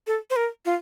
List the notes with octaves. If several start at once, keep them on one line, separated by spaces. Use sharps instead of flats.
A4
C5
A#4
F4